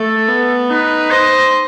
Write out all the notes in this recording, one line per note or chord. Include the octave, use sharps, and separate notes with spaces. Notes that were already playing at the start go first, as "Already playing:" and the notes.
Already playing: A3 A4
B3
D#4 B4
C5 D#5